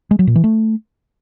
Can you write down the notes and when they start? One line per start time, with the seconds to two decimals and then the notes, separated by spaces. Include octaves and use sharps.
0.11 G#3
0.19 F#3
0.27 A#2
0.35 E3
0.44 A3